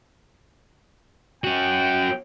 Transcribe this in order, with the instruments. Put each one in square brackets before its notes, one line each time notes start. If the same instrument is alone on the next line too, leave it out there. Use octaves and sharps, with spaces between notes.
[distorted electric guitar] C#4 F#4 [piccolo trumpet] G5